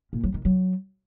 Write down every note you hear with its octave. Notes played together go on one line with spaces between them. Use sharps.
A#2
F#3
D#3
F#3